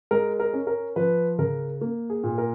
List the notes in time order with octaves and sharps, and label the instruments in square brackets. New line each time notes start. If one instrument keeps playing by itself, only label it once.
[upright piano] G#3 A#4
A#4
C#4
A#4
F3 B4
C#3 A#4
A#3
G#4
A#2
A#4